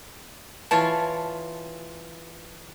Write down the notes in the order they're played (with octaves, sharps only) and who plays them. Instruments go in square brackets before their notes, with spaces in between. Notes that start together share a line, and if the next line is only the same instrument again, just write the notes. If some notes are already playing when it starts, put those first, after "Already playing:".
[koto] E3 F4 C#5 [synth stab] A5